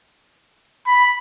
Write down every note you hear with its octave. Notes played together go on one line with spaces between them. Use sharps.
B5